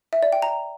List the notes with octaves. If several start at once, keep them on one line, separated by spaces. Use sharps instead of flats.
E5
D5
G5
A#5